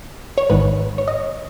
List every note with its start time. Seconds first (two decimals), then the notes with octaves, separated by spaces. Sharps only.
0.38 C#5
0.49 A1 G#2 D#3 B4
0.98 C#5
1.08 D#5